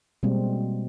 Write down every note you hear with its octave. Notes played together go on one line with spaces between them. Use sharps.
B2 G3 G#3 A#3 C4